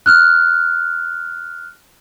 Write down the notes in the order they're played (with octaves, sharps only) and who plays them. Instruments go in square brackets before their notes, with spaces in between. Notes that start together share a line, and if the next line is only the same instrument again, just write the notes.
[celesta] F6 F#6